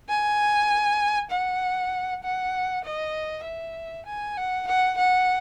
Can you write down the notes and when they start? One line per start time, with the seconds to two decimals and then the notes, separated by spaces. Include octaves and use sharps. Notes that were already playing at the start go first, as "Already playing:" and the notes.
0.09 G#5
1.31 F#5
2.23 F#5
2.85 D#5
3.45 E5
4.06 G#5
4.37 F#5
4.68 F#5
4.98 F#5